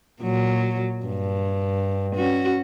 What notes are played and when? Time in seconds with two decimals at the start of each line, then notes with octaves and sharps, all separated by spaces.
0.22 A#2 F#3
1.06 G2
2.15 C#4 F#4